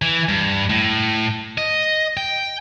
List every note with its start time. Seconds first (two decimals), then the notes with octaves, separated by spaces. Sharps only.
0.02 E3
0.28 G2
0.70 A2
1.58 D#5
2.17 G5